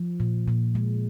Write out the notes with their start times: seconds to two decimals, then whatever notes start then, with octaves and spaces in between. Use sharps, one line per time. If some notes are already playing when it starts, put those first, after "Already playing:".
Already playing: F3
0.20 A#2
0.48 A#2
0.75 G#3